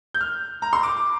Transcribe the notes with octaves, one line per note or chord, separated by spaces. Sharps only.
G6
F6
A#5
C6
D6